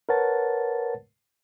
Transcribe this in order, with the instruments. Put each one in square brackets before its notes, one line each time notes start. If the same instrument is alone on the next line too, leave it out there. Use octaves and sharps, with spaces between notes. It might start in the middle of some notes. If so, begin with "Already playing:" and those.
[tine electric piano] A#4 B4 C#5 F#5 A5 A6